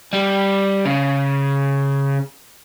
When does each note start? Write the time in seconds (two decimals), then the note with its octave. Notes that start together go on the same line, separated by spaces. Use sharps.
0.13 G3
0.85 C#3